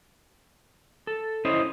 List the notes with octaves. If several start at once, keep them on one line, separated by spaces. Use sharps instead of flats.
A4
C#4 E4 C5 D#5